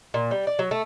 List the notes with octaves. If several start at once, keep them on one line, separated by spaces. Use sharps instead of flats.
A#2
G3
D5
F#3
A3